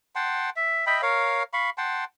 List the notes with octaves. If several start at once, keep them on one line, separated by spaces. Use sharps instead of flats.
F#5 G5 A5 C6
E5
D#5 E5 G5 B5
A#4 C#5 F5
F5 B5 C#6
F#5 G5 A5 C6